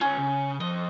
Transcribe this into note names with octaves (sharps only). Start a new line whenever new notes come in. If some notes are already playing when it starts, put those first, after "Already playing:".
C#4 F4 C#5
C#3
F2 D#5